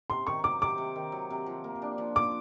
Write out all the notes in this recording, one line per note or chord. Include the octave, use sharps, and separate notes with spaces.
C3 C6
D#3 C#6
F#3 D6
C3 D6
C3
D#3
F#3
C3
F3
A#3
D4
F3
F3 D6